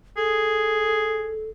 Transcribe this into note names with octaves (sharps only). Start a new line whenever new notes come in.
G#4 A4